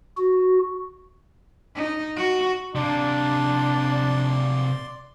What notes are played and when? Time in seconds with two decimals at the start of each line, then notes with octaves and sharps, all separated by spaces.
0.17 F#4
1.75 D#4
2.16 F#4
2.75 C3 A#3 D4 D5 C6